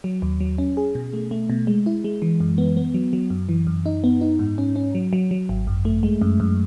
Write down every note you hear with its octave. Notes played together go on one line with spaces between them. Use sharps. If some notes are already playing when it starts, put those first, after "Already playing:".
F#3
D#2
F#3
C#4
G#4
B2
A3
A3
B2
G#3
E4
G#3
E3
F#2
B3
B3
F#3
F#3
F#2
E3
F#2
D#4
B3
D#4
G#2
C#4
C#4
F#3
F#3
F#3
G#1
F#2
A3
G#3
F#2
F#2